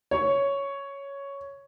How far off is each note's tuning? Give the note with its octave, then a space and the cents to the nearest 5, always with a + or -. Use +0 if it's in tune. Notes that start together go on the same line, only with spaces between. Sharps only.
C#5 +5